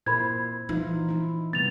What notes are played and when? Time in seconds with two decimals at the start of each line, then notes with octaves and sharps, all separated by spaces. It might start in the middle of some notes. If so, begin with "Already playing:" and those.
0.06 A#2 E4 A#4 C5 B5 G#6
0.69 E3 F3 D#4 F4
1.09 D#4 E4
1.53 C3 G3 B3 A6 F7